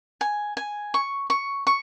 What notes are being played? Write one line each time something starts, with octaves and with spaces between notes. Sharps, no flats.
G#5
G#5
C#6
C#6
C#6